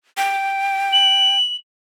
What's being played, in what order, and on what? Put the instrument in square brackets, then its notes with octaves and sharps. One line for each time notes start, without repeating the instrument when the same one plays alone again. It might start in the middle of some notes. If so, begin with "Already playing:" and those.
[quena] G5
[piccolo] F#7